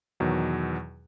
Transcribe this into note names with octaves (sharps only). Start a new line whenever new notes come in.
E2 B2 D#3 F#3